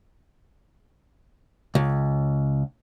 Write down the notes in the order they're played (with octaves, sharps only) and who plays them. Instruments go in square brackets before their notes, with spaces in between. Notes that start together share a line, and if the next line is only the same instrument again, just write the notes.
[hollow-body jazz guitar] C#2